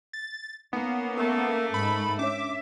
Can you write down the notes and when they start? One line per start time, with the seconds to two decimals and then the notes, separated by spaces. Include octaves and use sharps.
0.13 A6
0.73 A#3 B3 C#4 D#4
1.18 A3 A#4
1.74 G#2 B5
2.19 C#4 D4 C#5 E5 D6